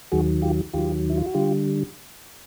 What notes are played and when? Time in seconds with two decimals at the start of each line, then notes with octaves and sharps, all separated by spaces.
0.11 D#2 D#3 F#3 F#4 G#4
0.42 F4 G4
0.73 D#2 D#3 F#3 F4 G4
1.10 E4
1.17 F4
1.26 F#4
1.34 D3 G3 F4 G4